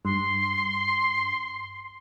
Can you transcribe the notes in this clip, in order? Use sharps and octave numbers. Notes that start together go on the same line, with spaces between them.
G2 C6